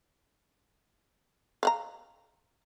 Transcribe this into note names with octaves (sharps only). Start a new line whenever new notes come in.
F5 F#5 A#5